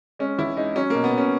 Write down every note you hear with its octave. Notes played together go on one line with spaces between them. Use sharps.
G#3 C#4
E2 E4
G#3 D#4
F#3 C#4
B2 A#3
B3
B2 C#4